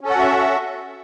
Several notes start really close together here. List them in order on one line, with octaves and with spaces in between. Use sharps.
C#4 A4 F#5 F#4 E5